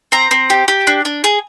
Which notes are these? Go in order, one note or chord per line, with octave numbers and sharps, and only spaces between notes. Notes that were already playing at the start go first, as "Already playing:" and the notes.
C4 A#5
C4
G4
G4
D4
D4
G#4